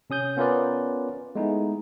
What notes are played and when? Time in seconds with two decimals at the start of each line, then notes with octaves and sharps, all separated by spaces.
0.10 C3 C#4 D#6 G6
0.37 B3 C#4 F4 A#4 B4 D5
1.35 G#3 A3 B3 D#4 E4 G#4